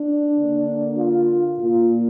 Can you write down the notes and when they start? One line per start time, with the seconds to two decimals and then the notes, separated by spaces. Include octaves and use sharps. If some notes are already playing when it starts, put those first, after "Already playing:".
Already playing: D4
0.38 D3 A#3
0.98 F4
1.59 A#2 A#3 F4